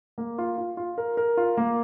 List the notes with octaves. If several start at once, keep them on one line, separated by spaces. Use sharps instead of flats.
A#3
F4
F4
F4
A#4
A#4
F4
A#3